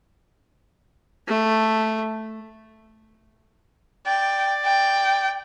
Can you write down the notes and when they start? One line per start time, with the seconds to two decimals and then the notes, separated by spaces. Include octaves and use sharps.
1.28 A3
4.06 D5 G5
4.66 G5